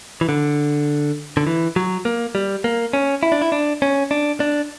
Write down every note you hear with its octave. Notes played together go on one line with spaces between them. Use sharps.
E3
D3
D3
E3
F#3
A#3
G3
A#3
C#4
E4
D4
E4
D4
C#4
D4
D4